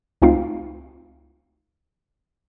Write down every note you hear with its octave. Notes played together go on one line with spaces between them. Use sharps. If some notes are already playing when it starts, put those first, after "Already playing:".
C#2 A3 C4 D#4 F4 F5